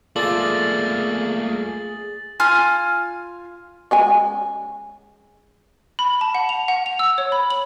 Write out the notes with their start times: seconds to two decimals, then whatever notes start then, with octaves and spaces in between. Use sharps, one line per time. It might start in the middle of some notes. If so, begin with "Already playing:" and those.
0.16 A3 A#3 F4 G#4 A4 D5 A6 F#7
2.40 F4 G#5 F6
3.91 C#3 G#3 G#5
5.99 B5
6.21 A5
6.35 F#5
6.49 F7
6.68 F#5
6.86 F7
6.99 E6
7.18 C#5
7.32 B5
7.50 F#7